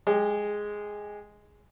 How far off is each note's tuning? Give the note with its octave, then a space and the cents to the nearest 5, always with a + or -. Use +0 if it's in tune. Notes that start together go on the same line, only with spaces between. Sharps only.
G#3 +0 G4 +25